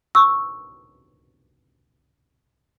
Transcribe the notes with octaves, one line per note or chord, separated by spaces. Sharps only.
C#6 E6